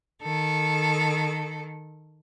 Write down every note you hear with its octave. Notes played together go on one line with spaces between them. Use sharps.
D#3 A4